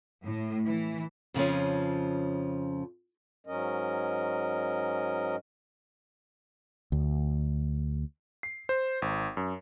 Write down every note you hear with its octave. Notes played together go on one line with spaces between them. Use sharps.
A2
E3
F2 C#3 F3 C#4
G#2 F#3 C#4 A#4 D#5
D2
C7
C5
G#1
F#2